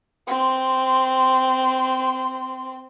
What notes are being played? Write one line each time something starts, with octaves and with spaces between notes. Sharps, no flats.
C4 C6